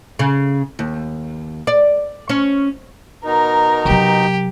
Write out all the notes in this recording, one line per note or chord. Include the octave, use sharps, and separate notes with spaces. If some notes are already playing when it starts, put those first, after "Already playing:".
C#3
D#2
D5
C#4
B2 D#4 A#4
C3 F#3 G4